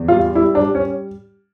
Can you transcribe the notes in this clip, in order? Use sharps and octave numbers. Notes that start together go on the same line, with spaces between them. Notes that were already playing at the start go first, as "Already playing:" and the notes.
Already playing: E2
G3 F4
G3 E4
D4
G3
C#4